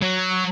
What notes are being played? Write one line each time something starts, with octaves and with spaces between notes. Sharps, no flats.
F#3